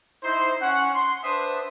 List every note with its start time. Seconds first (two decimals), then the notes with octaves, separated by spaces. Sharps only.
0.23 D#4 E4 C5
0.61 C#4 F#5
0.95 C6
1.24 D4 B4 C5 E5 D#6